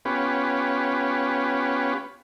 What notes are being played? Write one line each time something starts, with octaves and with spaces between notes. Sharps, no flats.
B3 C#4 F4 G4 B4